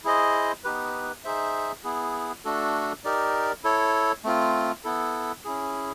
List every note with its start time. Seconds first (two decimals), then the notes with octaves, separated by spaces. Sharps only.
0.05 E4 G#4 C5 D#5
0.64 B3 D#4 G4 B4
1.24 D#4 G#4 C5 E5
1.84 B3 E4 G#4
2.45 A3 D4 F#4 A4
3.05 D#4 G4 A#4 D5
3.64 E4 A4 C#5
4.24 A3 C4 F4
4.84 B3 E4 A4
5.45 C#4 E4 G#4